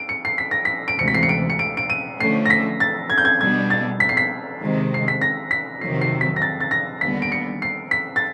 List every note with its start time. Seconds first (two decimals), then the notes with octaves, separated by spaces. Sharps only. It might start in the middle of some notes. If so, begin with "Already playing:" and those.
Already playing: D7
0.09 C#7
0.25 C7
0.38 B6
0.51 A#6
0.65 B6
0.88 D7
0.99 D2 C3 E3 G#3 C#7
1.08 B6
1.14 C7
1.23 C#7
1.29 D7
1.50 C#7
1.59 D7
1.77 D7
1.90 D#7
2.20 D3 F3 A3 C#4 C7
2.46 A#6
2.50 B6
2.80 A6
3.10 G#6
3.18 G6
3.25 G#6
3.41 B2 G3 B3 D4 G#6
3.70 A6
4.00 B6
4.09 C7
4.17 B6
4.61 C3 D#3 G#3
4.94 C7
5.08 B6
5.22 A#6
5.51 B6
5.81 F2 C3 D#3 F#3 C7
6.01 C7
6.21 B6
6.36 A#6
6.42 A6
6.60 A6
6.71 A#6
7.01 D#2 D3 G3 B3 B6
7.22 D7
7.32 C#7
7.62 C7
7.91 B6
8.16 A6